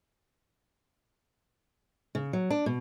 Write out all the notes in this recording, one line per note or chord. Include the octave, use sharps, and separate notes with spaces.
C#3
F#3
D4
B2